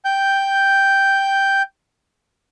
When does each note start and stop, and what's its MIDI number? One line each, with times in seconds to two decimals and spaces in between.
0.05 1.62 79
0.05 1.62 91